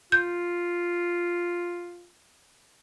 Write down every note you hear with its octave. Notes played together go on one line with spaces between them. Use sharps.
F4 G6